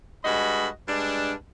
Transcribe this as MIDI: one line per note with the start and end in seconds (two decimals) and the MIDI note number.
0.25 0.68 43
0.25 0.68 56
0.25 0.68 66
0.25 0.68 75
0.25 0.68 83
0.88 1.33 43
0.88 1.33 56
0.88 1.33 62